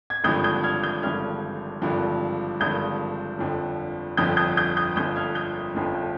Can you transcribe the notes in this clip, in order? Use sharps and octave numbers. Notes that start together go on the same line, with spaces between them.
G#6
G#1 G2 D3 F3 D#6 G6
D#6 G6
F6 G#6
D#6 G6
G#1 G2 D3 F3 F6 G#6
G#1 G2 D3 F3
G#1 G2 D3 F3 D#6 G6
G1 F2 D3 F3
G1 F2 D3 F3 D#6 G6
D#6 G6
D#6 G6
D#6 G6
G1 F2 D3 F3 D#6 G6
F6 G#6
D#6 G6
G1 F2 D3 F3